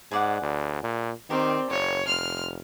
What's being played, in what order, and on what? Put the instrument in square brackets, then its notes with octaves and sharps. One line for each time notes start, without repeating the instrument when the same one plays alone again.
[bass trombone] G#2 [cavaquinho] G#4 D5 F#5
[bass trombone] D2
A#2
[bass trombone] D#3 [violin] C4 [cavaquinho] G4 A#4 D5
[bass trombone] F#1 [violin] C#5
[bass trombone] F1 [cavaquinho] C6 [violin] F6